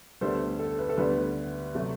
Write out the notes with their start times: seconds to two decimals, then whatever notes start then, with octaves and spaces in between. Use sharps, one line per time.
0.21 D2 D3 G3 B3 A4 C5
0.59 A4
0.78 B4
0.89 A4
0.97 D2 D3 G3 B3 B4
1.74 C3 F#3 A3